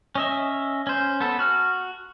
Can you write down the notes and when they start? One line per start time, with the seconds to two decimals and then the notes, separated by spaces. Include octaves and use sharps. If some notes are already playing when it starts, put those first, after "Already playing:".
0.15 C#4 D#5 E5
0.87 C#4 C5
1.21 B3 A4
1.39 F#4 F6